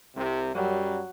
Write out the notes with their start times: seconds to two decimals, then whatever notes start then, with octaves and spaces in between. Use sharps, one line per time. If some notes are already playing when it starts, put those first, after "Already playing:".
0.16 C2 C3
0.54 F#2 F#3 G3